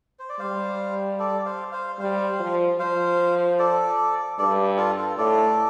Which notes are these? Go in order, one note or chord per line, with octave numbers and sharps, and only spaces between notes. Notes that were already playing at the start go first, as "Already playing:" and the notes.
C5
D5
G3 C5 F5
A4 D5
C5 F5
C5 F5
G3 C5 F5
F3
F3 C5 F5
A4 D5
G2 A4 D5
F4 A4
F4 A4
A2 A4 D5